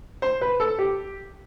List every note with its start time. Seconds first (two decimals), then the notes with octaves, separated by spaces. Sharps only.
0.22 C5
0.41 B4
0.60 A4
0.79 G4